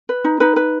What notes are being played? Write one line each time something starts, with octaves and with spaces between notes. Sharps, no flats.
B4
D#4
D#4 B4
B4